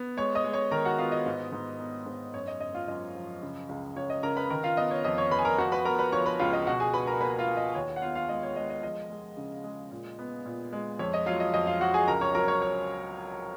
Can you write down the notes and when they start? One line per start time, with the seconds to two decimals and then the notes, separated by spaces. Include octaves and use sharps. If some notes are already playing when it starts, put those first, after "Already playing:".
Already playing: B3
0.17 G#3 C#5 C#6
0.35 D#5 D#6
0.44 G#3
0.53 C#5 C#6
0.71 D#3 A#4 A#5
0.85 F#4 F#5
0.98 B3 F4 F5
1.12 D#5
1.26 G#2
1.52 G#2
1.80 B3
2.06 G#2
2.34 F#2 C#5
2.47 D#5
2.60 F#2 D#5
2.74 F4 F5
2.88 F#2 D#5
3.15 F3
3.42 C#3
3.69 C#2
3.96 C#2 C#5
4.10 D#5
4.23 C#3 A#4 A#5
4.37 B4 B5
4.50 D#3 A#4 A#5
4.64 F4 F5
4.77 B3 D#5
4.91 C#5
5.04 F2 D#5
5.18 C#5 C#6
5.31 F2 B4 B5
5.39 G#5
5.45 A#4 A#5
5.58 F3 F#4 F#5
5.72 B4 B5
5.85 B3 A#4 A#5
5.99 B4 B5
6.12 F3 C#5 C#6
6.26 B4 B5
6.39 C#2 F4 F5
6.53 D#5
6.67 B2 F#4 F#5
6.80 G#4 G#5
6.94 B2 B4 B5
7.07 A#4 A#5
7.21 A#3 B4 B5
7.39 F4 F5
7.48 A#3
7.57 D#5
7.75 D#2 C#5
7.96 F#5
8.02 B3 F4 F5
8.15 F4 F5
8.29 G#3 D#5
8.43 C#5
8.56 G#3 D#5
8.69 D#5
8.83 F3 D#5
9.10 G#3
9.37 C#3
9.64 G#3
9.91 A#2
10.19 B3
10.46 A#2
10.73 G#3
10.99 F2 C#5
11.13 D#5
11.26 F#3 F4 F5
11.40 D#5
11.54 F2 D#5
11.67 F4 F5
11.80 F2 F#4 F#5
11.94 G#4 G#5
12.07 C#2 A#4 A#5
12.21 C#5 C#6
12.34 F#3 A#4 A#5
12.48 C#5 C#6
12.62 C#5 C#6